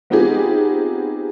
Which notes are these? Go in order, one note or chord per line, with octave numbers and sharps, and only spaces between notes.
B3 C4 D#4 F4 G4 G#4